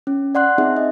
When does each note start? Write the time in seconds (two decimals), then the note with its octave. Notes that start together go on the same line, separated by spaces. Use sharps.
0.07 C#4
0.35 D5 F#5 C6 F#6
0.58 C4 D#4 G#4 E5
0.76 D#5